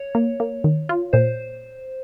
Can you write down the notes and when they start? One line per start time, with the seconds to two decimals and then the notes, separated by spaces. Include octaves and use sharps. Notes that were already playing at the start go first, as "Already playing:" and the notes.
Already playing: C#5
0.15 A#3
0.40 A#3
0.64 D#3
0.89 F4
1.13 A#2 C5